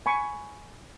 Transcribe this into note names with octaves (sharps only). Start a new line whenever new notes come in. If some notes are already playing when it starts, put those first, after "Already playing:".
G#5 B5 C#6